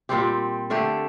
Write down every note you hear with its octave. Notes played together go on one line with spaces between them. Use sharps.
A#2 G3 C4 G4
D3 A3 D4 G4